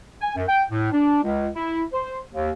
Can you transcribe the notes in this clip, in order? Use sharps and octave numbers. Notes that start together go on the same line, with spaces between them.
G#5
F#2
G5
A2
D4
C#2
E4
C5
D#2